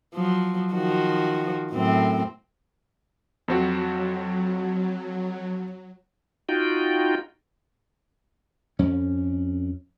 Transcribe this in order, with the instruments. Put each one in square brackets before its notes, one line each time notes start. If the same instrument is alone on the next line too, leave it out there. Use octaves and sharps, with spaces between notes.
[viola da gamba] F3 F#3
D#3 F3 F#4
F#2 A2 C4
[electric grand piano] F2 C4 F#4 [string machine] F#3
[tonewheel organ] D#4 F4 F#4 G5
[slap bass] F2 C#4